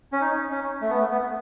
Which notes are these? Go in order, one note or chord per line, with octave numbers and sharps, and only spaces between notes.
C#4
D#4
C#4
A3
B3
A3
B3